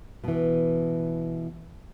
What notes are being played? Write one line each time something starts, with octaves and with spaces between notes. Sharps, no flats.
B2 E3